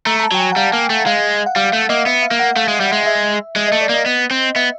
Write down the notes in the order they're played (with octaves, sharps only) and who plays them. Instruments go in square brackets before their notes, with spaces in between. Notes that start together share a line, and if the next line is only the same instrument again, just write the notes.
[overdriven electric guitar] A3 [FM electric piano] A#5
[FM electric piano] A#5
A5
[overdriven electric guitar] F#3 [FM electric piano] G5
[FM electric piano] G#5
F#5
[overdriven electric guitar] G3 [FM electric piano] F5
[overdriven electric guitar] A#3
A3
[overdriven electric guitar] G#3 [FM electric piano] F5
[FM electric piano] F#5
[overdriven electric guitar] G3 [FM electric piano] F5
[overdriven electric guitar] A3 [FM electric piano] E5
[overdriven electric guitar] A#3 [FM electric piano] D#5
[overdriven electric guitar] B3 [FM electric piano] E5
[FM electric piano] F5
[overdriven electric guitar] A#3
[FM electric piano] F#5
[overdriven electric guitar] A3 [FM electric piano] F5
[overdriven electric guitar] G#3
[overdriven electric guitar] G3 [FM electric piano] E5
[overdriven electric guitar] G#3
[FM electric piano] E5
[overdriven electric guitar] G#3 [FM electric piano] E5
[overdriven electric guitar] A3 [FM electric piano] D#5
[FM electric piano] D5
[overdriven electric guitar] A#3 [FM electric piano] D#5
[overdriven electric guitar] B3
C4
[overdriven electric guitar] B3 [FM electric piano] E5